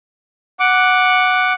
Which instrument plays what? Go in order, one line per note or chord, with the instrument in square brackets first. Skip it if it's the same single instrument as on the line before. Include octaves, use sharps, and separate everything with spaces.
[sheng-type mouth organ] F#5 D6